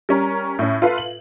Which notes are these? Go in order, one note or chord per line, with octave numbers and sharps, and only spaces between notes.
G3 C#4 A#4
A2 C#4
F4 A4 B4 F5
F#7